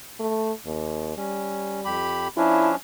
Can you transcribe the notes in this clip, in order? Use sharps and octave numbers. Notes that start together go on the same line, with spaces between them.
A3
D#2
G3 C#4
F2 G4 B5
F3 C#4 D4 E4